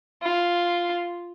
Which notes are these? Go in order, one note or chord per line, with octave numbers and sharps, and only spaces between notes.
F4